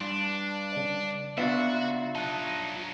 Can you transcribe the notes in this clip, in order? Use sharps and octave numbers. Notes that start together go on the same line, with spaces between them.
G2 D4 C6
C#3 D5
C#3 B3 D4 F4 F#4 E5
F#3 D#4 A5 F#6